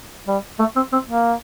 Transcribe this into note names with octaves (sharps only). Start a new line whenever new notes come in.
G3
A3
C4
C4
A#3